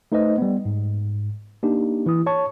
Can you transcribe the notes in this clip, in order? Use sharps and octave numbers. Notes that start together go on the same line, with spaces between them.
A3 D#4 B4 C5 D#5
G3 B3
G#2
A#3 D4 D#4 G4
E3 E4 D#6
C#5 A5 C#6